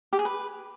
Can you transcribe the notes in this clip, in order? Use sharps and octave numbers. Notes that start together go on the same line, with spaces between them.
G4
G#4
B4